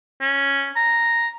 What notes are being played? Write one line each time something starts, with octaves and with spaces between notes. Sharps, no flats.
C#4
A#5